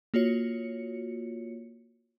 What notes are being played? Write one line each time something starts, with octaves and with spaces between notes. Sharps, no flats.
A#3 F4 F#4 C#5 C#7